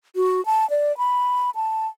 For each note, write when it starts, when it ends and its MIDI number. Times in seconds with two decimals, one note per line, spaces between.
0.16 0.44 66
0.46 0.68 81
0.70 0.96 74
0.98 1.50 83
1.55 1.87 81